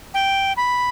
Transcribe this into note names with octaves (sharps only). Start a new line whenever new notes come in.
G5
B5